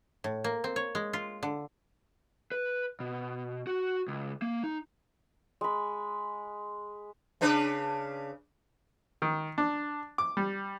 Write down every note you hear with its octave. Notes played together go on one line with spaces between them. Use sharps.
A2
A#3
C4
C#5
G#3
F4
D3
B4
B2
F#4
C#2
A#3
D#4
G#3 B5
C#3 D4 B4
D#3
D4
D6
G3